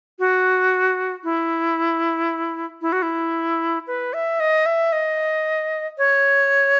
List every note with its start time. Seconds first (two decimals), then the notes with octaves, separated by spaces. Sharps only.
0.19 F#4
1.24 E4
2.82 E4
2.92 F#4
3.02 E4
3.87 B4
4.13 E5
4.40 D#5
4.66 E5
4.92 D#5
5.98 C#5